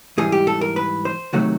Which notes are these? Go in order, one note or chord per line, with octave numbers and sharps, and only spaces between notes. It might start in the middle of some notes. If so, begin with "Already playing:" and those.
G#2 E3 G3 G#4
G4
A4
A#4
B4
C5
C3 D#3 F#3 A3 F#4